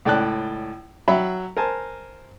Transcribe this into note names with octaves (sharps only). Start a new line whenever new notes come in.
C#2 A2 D5 G5 A5 F#6
F#3 E5 G5 B5
A#4 C5 G#5 A5